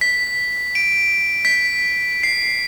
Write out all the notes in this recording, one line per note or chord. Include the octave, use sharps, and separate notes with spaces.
B6
D7
B6
C7